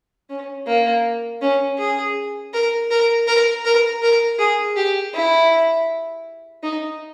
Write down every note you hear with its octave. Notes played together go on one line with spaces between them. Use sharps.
C#4
A#3
C#4
G#4
A#4
A#4
A#4
A#4
A#4
G#4
G4
E4
D#4